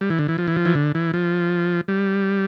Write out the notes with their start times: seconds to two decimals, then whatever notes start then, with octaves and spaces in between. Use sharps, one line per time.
0.01 G3
0.10 E3
0.19 D3
0.28 E3
0.38 F3
0.47 E3
0.56 F3
0.65 E3
0.75 D3
0.95 E3
1.14 F3
1.88 G3